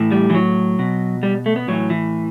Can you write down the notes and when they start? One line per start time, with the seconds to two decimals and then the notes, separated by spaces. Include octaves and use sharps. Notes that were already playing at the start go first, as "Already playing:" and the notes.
Already playing: A2 E3
0.12 G3
0.30 E3
0.35 F#3
0.79 B2
1.23 G3
1.46 A3
1.56 B3
1.68 A2 E3 F#3
1.90 E3